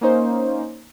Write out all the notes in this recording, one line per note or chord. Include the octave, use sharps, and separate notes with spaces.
A#3 C#4 D#4 C5